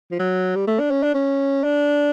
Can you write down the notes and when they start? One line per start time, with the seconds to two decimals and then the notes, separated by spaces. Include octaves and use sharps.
0.12 F3
0.19 F#3
0.56 G3
0.67 A3
0.80 D4
0.91 C#4
1.03 D4
1.14 C#4
1.64 D4